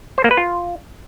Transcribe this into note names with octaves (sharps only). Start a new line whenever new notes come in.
C5
A#3
B4
F4